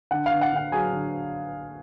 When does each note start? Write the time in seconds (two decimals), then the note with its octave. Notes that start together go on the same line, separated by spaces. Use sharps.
0.11 D3 F#5
0.26 F5
0.31 D3
0.41 F#5
0.52 D3 F#5
0.72 F#3 G#4 G#5
0.93 D3